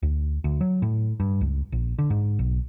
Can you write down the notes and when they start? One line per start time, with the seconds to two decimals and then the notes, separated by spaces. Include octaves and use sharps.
0.03 D2
0.44 D2
0.61 F#3
0.82 A2
1.20 G2
1.41 C#2
1.72 A#1
1.99 D3
2.10 G#2
2.39 B1